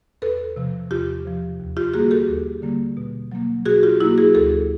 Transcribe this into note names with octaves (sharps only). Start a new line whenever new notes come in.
E2 A4 B4
C3 F3
E2 F4 G4
C3 F3
D#2
F4 G4
D3 G3 A#3 F#4 G#4
G4 A4
D#2
D3 G3 A#3
B2
F#3 A#3
B2 F#4 G#4
F4 G4
F#3 A#3 E4 F#4
F#4 G#4
D2 G4 A4